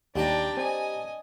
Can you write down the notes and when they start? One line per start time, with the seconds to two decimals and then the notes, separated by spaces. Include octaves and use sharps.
0.15 D#2 G3 D4 G4 G5 A5 A#5
0.57 C4 D#5 G#5